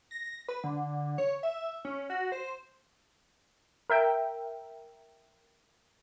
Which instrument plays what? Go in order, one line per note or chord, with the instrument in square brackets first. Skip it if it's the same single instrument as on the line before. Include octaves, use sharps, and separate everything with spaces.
[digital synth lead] A#6
B4
D3
C#5
E5
C#4
F#4
C5
[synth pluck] A#4 E5 G5